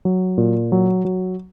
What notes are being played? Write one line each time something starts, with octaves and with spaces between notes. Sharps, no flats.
F#3
A#2
F#3
F#3